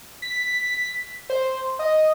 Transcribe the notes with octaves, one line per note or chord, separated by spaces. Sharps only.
B6
C5
D#5